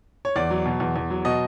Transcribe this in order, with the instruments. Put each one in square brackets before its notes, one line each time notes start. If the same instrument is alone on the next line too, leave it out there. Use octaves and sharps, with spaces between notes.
[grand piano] C#5
E2 D5
F#3
B2
E2
E2
F#3
B2 D#5